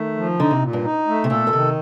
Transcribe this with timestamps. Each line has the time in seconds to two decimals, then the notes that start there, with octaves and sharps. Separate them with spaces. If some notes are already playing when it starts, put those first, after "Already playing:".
Already playing: D#3 A3
0.16 F3
0.40 D3 D#4
0.51 C3
0.62 A#2
0.73 G2
0.85 D#4
1.07 A3
1.24 C3
1.30 A#2 A4
1.47 A#2
1.53 C3 D#3